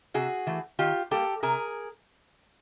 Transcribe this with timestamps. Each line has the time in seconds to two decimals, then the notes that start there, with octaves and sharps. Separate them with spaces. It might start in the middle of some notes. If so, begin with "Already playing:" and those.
0.14 C3 F#4 G#4
0.47 E3 A3
0.79 D#3 F4 G4
1.11 G3 A#3 G4 A4
1.43 C3 G#4 A#4